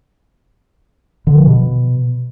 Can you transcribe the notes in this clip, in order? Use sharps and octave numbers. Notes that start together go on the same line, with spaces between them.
D3
F3
B2